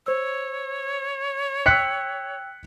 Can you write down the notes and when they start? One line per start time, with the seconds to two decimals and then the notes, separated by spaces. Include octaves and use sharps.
0.06 C5 C#5 E6
1.66 G5 E6 F#6 B6 C#7